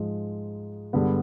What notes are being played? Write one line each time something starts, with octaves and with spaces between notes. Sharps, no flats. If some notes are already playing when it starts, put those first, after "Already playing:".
Already playing: G#2 F3 G#3
G2 D3 G#3 B3